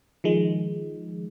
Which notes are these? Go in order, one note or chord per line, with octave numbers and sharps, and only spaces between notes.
D#3 F3 G#3